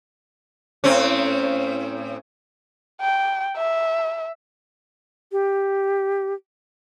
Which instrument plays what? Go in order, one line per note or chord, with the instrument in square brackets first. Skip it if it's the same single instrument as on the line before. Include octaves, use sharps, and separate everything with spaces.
[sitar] A2 C4 C#4
[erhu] G5
E5
[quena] G4